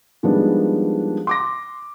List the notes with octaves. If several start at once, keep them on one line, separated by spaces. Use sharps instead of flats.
D#3 F3 G3 G#3 B3 D4
C6 D6 A#6